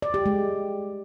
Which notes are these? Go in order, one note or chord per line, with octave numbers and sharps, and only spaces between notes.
D5
G4
G#3